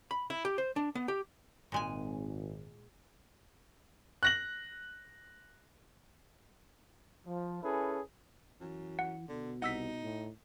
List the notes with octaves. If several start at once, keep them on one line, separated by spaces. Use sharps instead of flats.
B5
E4
G4
C5
D4
B3
G4
G#1 A#2 G#3 G#5
F#6 A#6 F#7
F3
C#4 E4 G#4 A4 B4
F#2 E3
F#5
B2 D3
C2 D#4 F#5 E6 B6
A2